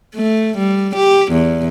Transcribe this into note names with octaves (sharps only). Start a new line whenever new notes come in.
A3
G3
G4
E2